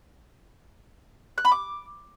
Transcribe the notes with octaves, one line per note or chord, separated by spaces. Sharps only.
F#6
B5
D6